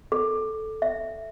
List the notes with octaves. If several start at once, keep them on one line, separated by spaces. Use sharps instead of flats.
A4
E5